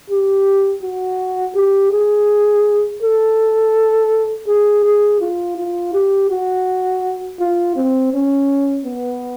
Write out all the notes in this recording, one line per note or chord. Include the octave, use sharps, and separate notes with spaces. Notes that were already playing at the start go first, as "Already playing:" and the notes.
G4
F#4
G4
G#4
A4
G#4
G#4
F4
F4
G4
F#4
F4
C4
C#4
B3